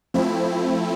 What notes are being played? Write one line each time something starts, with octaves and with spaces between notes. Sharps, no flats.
F3 A3 C4 E4